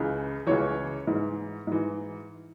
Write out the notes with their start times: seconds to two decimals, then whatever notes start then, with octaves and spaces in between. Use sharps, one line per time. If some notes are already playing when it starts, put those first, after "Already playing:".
Already playing: C#2 C#3 E3
0.46 C#2 C#3 E3 C#5
1.07 G#2 E3
1.67 G#2 E3